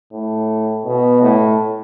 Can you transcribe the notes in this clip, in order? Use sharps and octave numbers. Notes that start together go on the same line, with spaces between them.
A2
B2
A2